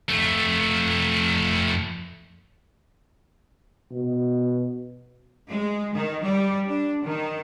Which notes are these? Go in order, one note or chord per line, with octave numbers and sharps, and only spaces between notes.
F2 A3
B2
G#3
D#3
G3
D4
D#3